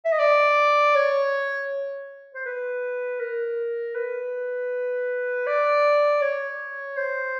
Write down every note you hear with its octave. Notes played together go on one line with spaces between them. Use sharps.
E5
D#5
D5
C#5
C5
B4
A#4
B4
D5
C#5
C5